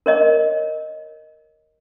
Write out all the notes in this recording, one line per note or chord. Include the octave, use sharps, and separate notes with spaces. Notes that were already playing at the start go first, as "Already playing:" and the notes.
A#4 C#5 D#5